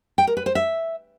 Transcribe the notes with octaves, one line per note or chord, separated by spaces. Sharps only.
G5
A#4
B4
C5
E5